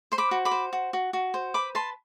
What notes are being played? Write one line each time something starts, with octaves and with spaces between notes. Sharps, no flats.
C5 C6
B5 D6
F#4
B5 D6
C5
F#4
F#4
F#4
C5
B4 B5 D6
B4 A5 C6